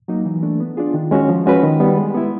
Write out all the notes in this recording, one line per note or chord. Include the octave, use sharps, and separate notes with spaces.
F#3 A#3 D#4
E3
A3 D4
B3
D4 F4 G#4
D#3
G#3 C#4 F#4
F3
G#3 C#4 F#4 B4
D#3
G3 B3
G#3
B3 E4